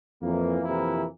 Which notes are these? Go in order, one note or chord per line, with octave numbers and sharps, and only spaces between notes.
F2 E3 A#3
F2 C3 E3 A#3 E4